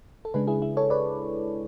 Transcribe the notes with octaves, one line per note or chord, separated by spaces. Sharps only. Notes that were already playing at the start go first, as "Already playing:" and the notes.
A4
C#3 G#3 D4 G#4 B4
E4 G#4
E4
A4 C#5
B4 D5